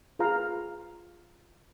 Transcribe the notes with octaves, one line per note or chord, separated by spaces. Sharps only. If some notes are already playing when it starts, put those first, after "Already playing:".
F4 G#4 B4 F5 A#5